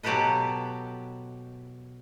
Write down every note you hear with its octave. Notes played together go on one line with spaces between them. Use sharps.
B2 F#3 G4 A4 B4 D#5